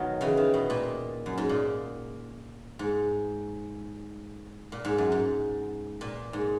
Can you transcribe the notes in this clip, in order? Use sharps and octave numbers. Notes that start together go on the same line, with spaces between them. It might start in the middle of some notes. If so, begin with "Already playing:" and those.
Already playing: B2 D#3 F#3
C#3 E3
D#3
B2
A#2
F#2
G#2
A#2
G#2
A#2
G#2
F#2
G#2
A#2
G#2